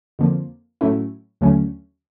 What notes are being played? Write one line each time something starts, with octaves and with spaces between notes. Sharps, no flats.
F2 D3 F3 A#3
A2 F#3 A3 C#4 E4
D#2 D3 F#3 A3 C#4